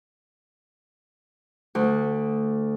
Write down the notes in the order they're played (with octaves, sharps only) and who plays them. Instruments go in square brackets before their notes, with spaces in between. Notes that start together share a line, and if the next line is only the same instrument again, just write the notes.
[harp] D2